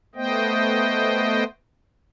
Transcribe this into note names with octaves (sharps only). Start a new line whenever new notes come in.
A3 B3 C5 D#5 G5